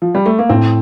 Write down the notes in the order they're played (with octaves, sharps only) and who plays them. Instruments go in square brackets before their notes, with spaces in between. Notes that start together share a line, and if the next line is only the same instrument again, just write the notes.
[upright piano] F3
G3
A3
A#3
[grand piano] A2 [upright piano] C4